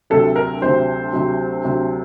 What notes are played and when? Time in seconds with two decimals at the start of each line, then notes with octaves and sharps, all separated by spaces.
0.10 D2 C3 F#3 A4
0.36 A#4
0.61 D2 C3 F#3 C5
1.13 D2 C3 F#3
1.64 D2 C3 F#3